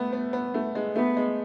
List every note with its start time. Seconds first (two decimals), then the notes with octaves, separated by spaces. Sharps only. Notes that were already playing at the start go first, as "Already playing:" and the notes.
Already playing: A3 B3
0.13 B3
0.33 B3
0.54 A3
0.75 G#3
0.96 A3 B3
1.17 G#3